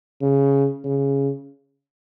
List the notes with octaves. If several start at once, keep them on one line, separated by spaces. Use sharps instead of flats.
C#3
C#3